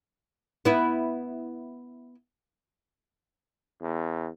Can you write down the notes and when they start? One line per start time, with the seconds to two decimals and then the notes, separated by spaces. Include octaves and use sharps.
0.65 B3 E4
3.82 E2